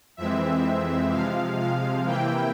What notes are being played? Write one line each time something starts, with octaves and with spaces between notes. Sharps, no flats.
F2 E3 G#3 C4 E5
C3 F3 G#3 F5
F5
C3 E3 A#3 E4 G5